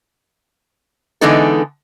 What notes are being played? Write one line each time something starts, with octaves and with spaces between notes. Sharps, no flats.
D3 E3 G#3 B3 D#4 A4